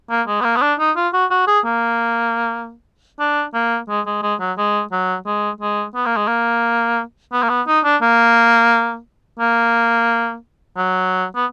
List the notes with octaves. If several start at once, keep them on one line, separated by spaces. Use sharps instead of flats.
A#3
G#3
B3
A#3
B3
D4
D#4
F4
F#4
F#4
G#4
A#3
D4
A#3
G#3
G#3
G#3
F#3
G#3
F#3
G#3
G#3
B3
A#3
G#3
A#3
B3
A#3
B3
D#4
D4
A#3
A#3
F#3
B3